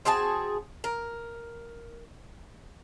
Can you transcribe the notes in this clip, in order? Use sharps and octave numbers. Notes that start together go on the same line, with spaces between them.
C4 F#4 G#4 A5
A#4